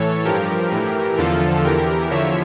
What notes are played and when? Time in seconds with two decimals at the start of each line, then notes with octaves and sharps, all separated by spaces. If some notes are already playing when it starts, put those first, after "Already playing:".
Already playing: A2 E3 A4 C#5
0.25 G2 F3 G4 A#4
0.72 A2 E3
1.18 E2 D3 F3 F4 A4
1.64 E2 E3 G4 A#4
2.11 E2 D3 F3 C#5 E5